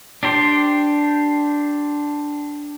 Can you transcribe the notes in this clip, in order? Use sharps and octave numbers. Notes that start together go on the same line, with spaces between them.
D4 G4 C5